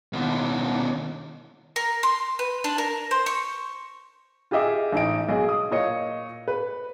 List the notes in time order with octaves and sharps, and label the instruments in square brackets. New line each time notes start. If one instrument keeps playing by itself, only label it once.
[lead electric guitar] D#2 B2
[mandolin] A#4
C6
B4
D4
A#4
C5
C#6
[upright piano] F4 G4 G#4 D#5 E5 D6
A1 D#4 D7
B1 G#4 D#5
D#6
A#2 C#5 D#5 C#7
B4